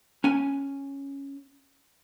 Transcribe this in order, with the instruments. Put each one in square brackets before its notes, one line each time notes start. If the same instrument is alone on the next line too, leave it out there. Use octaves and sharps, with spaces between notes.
[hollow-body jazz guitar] C#4 G#5